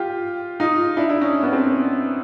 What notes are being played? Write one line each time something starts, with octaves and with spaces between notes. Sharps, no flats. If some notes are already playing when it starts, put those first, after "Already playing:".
Already playing: F4 G4
D#4 F4
D4 E4
D4 E4
C#4 D#4
B3 C#4
C4 D4